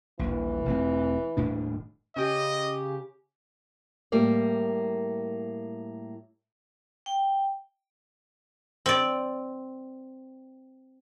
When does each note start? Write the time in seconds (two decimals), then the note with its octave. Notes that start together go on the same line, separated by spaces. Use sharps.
0.19 D#1 A#1 E3
0.65 E1 A3 C4
1.37 D#1 A2 D4
2.16 C#3 C#4 G4 D#5
4.12 A2 G3 A#3 D5
7.06 G5
8.86 C4 D5